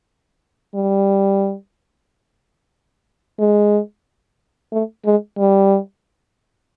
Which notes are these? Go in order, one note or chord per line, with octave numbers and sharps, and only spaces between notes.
G3
G#3
A3
G#3
G3